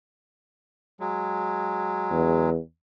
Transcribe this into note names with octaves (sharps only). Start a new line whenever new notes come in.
F#3 G#3
E2